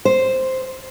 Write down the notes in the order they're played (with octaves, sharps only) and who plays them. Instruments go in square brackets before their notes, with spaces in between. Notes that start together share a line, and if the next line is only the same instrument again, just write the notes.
[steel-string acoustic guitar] C5